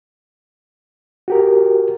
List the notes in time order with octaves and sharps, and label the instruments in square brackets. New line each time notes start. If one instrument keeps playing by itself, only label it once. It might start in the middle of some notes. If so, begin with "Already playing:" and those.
[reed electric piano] F#4 G4 A#4